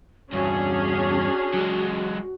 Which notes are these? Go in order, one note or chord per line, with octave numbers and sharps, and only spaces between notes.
E2 G2 C#4 D4 F#4 G#4
F#3 G#3